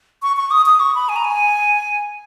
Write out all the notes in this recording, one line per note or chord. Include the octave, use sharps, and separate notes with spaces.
C#6
C#6
D#6
D#6
C#6
B5
G#5
A#5
G#5